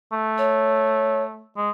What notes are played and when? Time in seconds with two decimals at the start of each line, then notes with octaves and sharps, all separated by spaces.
0.12 A3
0.38 C#5
1.57 G#3